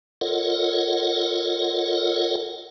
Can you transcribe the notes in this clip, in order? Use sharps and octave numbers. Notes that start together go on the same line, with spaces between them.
F4 A4 A#4 C#5 D#5 F#5